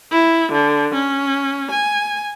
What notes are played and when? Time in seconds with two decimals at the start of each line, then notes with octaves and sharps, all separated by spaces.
0.11 E4
0.52 D3
0.94 C#4
1.71 G#5